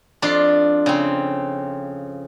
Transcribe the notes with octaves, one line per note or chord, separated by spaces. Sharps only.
F2 D4 F4 C6
C#3 C4